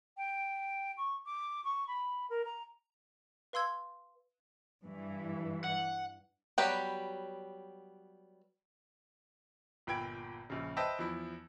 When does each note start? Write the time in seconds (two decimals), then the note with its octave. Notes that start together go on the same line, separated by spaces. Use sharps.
0.17 G5
0.97 C#6
1.26 D6
1.64 C#6
1.87 B5
2.30 A#4
2.45 A#5
3.53 B4 F5 C6 E6 G#6
4.84 G2 E3
5.64 F#5
6.58 F#3 G3 B3 G4 B4
9.87 G1 A#2 G5 B5 G#6 D7
10.50 A#1 C#3
10.77 B4 C5 D#5 E5 G5 A5
10.99 E2 F3 E4